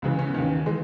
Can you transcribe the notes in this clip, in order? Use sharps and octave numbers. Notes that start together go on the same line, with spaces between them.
C#2 C#3 E3
C#4
B3
D#2 D#3 C#4
E3 G#3